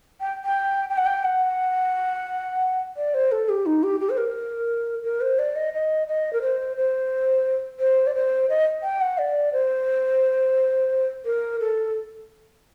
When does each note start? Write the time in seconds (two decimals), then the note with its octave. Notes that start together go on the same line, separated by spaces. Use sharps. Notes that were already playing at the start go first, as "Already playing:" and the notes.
0.21 G5
0.44 G5
0.90 G5
0.97 F#5
1.05 G5
1.24 F#5
2.97 D5
3.14 C5
3.32 A4
3.49 G4
3.66 D#4
3.83 G4
4.00 G4
4.10 C5
4.17 A#4
5.04 A#4
5.21 C5
5.39 D5
5.56 D#5
5.73 D#5
6.07 D#5
6.33 A#4
6.42 C5
6.77 C5
7.80 C5
8.07 D5
8.15 C5
8.49 D#5
8.83 G5
9.01 F#5
9.18 D5
9.53 C5
11.25 A#4
11.60 A4